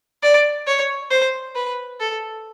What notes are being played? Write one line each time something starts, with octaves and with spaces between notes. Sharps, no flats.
D5
C#5
C5
B4
A4